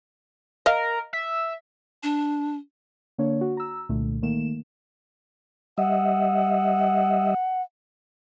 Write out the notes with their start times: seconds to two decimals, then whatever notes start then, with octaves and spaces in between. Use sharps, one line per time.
0.66 A#4 D#5 F5
1.13 E5
2.03 D4
3.18 D3 A#3 D4 C#5
3.41 F#4
3.57 A#5 E6
3.89 C2 A#2 D3 A3
4.22 D#3 A3 A#3 E7
5.78 G3 D#5 E5 F#5